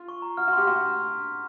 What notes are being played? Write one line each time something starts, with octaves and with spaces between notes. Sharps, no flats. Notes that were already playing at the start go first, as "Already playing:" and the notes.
Already playing: F4
C#6
A#5
F#4 F6
F#4
G4 C6
F#4 C6